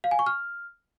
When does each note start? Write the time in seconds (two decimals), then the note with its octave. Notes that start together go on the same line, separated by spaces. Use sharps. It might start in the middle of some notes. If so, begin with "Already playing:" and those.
0.04 F5
0.11 G#5
0.19 C#6
0.26 F6